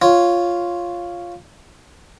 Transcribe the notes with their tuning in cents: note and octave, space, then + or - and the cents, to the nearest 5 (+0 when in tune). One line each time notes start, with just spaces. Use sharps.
F4 +0 C#5 +0